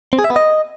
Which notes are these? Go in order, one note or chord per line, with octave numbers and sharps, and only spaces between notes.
C4
G#4
E5
B3
D#5